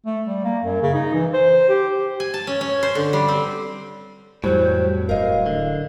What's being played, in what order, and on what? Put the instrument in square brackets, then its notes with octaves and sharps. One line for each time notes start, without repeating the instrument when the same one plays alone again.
[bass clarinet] A3
G3
A#3
F#2
C#3
D#4
E3
C5
G4
[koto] G#5
A5
C#4
C#4
C5
D3
G3
C4
[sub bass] F2 [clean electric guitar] A2 F#3 [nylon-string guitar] E3 G3 [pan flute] C5
[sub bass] D1 [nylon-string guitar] A#4 D#5 [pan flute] F5
[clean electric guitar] D3